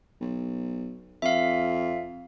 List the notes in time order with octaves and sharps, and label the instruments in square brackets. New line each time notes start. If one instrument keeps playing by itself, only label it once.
[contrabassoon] B1
[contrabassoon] F2 [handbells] E5 F5